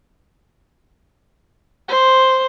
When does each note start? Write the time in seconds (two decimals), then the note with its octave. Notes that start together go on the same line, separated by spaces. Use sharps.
1.89 C5